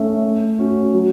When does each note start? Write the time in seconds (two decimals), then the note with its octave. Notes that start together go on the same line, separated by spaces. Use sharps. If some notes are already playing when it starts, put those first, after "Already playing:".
Already playing: A3 C#4 E5
0.24 A3
0.59 C#4 F#4
0.94 F#3